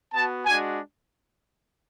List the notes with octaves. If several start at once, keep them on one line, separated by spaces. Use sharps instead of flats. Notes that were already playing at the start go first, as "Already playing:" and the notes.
B3 F#4 A5
G#3 D4 F#4 G#5